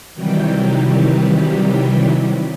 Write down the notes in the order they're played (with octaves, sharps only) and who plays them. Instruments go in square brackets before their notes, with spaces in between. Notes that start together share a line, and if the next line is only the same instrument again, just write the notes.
[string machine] C3 D#3 E3 F#3 G3 G4